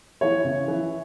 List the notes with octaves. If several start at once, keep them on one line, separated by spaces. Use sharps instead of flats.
E3 C#5
C#3
E3